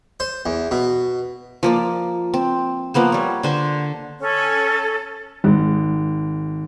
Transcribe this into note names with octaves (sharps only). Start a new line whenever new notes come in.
C5
E2
B2
F3 A#3 D5
C4
F3 A#3 B3 C5
G3 C#5
D3 C5 G#5
C#4 A4
G#1